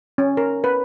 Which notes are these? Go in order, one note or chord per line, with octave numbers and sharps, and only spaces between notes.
C#4
A#4
B4